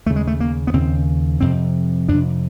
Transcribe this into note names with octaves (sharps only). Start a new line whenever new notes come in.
D#2 C#3 A3
G#3
A3
A#3
B3
D#2 C#3 C4
F2 C3 C4
F2 C3 D4